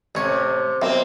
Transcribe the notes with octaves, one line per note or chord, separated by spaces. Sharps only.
A1 C3 C#5
B1 A#3 C4 A#4 C5 E5